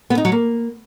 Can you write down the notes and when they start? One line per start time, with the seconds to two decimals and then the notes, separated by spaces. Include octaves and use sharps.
0.10 B3
0.17 D#4
0.25 F#3
0.32 A#3